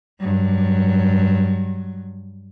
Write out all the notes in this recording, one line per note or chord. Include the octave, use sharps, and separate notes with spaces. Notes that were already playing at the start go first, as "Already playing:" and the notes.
G2 F#3